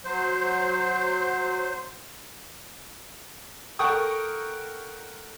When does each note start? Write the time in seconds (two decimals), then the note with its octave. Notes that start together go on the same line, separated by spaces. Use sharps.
0.05 F#3 C5
3.79 A4 A#4 F#5 G5 C#6 D#6